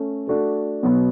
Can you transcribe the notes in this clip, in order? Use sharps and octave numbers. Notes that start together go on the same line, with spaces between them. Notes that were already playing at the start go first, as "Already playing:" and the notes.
Already playing: A3 C#4
A3 D4 F#4 A4
B2 F#3 B3